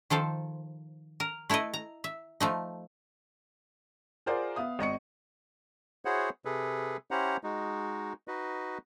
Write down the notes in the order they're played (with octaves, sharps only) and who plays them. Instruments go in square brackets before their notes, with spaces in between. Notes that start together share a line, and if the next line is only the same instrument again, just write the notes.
[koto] D#3 F3 A4 C5
A#4
A3 E4 A4 B4 D#5
A#5
E5
F3 A3 D#4
[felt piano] F4 G#4 A#4 C5 D5 F#5
B3 E5 F5 D#6
G#1 D#5 C#6 C#7
[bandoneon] E4 F#4 G#4 C5 C#5 F#5
C3 G#4 A4 B4
C#4 E4 G4 C5 F#5 A#5
G#3 D#4 F#4
D#4 F#4 B4 D#5